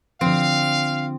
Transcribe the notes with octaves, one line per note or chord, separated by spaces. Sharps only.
D3 F3 C4 F5